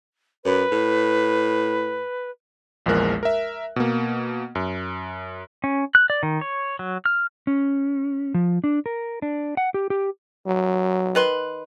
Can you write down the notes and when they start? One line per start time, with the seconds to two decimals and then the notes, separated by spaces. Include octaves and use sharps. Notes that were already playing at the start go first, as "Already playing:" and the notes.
0.45 F#2 B4
0.72 A2
2.86 A#1 E2 F3 G#3 A#4 F#6
3.23 A#4 E5
3.76 B2 A#3
4.55 F#2
5.64 C#4
5.95 F#6
6.10 D5
6.23 D#3
6.41 C#5
6.79 F#3
7.06 F6
7.47 C#4
8.34 F3
8.64 D4
8.86 A#4
9.22 D4
9.57 F#5
9.74 G4
9.90 G4
10.46 F#3
11.15 D#3 B4 C6